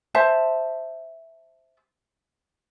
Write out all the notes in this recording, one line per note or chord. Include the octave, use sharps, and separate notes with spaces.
C5 E5 A5